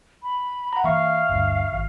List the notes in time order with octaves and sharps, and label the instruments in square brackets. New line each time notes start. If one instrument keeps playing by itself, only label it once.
[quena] B5
[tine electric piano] F#5 A#5
[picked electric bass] E3 A#3 [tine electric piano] E5 C#6 [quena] F5
[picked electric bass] G1 D2 G2
G#1